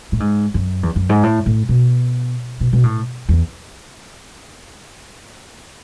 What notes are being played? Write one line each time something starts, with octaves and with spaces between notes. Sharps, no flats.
A2
G#2
F#2
E2
F#2
G#2
A2
A2
B2
B2
B2
A2
E2